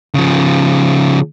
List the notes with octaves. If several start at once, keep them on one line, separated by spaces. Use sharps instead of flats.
C#3 F3